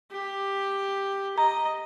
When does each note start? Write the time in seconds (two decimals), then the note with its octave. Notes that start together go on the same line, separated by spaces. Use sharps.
0.11 G4
1.38 D#5 A#5